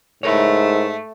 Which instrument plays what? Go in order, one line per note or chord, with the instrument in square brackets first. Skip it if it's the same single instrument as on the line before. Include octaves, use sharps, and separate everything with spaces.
[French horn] G#2 [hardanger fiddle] A3 [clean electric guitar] E4 A#4 C#5